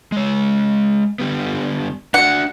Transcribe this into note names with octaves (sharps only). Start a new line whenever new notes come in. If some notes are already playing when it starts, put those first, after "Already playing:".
G#3 C#5
D3 G3 B3
D4 F#4 F#5